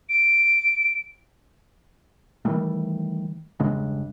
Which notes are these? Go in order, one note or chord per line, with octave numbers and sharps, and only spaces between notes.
D7
D#3 E3 G3 A3
E1 G2 C#3 G#3